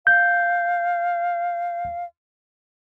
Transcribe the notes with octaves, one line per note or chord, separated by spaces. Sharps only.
F5 G6